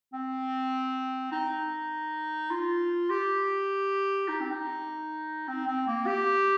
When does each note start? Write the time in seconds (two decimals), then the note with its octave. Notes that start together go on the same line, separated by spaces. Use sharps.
0.13 C4
1.32 D#4
2.51 F4
3.10 G4
4.28 D#4
4.40 C4
4.51 D#4
5.48 C4
5.67 C4
5.87 A#3
6.07 G4